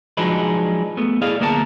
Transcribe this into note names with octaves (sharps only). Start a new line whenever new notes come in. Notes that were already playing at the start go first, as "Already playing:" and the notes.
F3 F#3 G#3 D4 D#4 B4
A3 B3
E4 G#4 D5 D#5 F5
D2 A#3 B3 A#4 C#5 A5